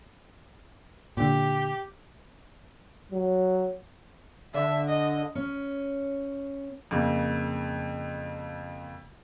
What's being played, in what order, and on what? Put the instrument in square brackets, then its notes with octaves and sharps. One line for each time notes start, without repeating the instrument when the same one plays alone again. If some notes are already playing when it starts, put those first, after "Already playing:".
[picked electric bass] A#2 D3 [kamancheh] G4
[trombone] F#3
[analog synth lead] D3 [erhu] E5
[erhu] D#5
[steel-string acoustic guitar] C#4
[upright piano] F2 C#3 A#3